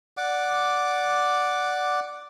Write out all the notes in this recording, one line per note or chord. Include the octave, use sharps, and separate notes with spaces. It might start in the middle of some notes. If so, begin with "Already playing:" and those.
D5 F#5 D6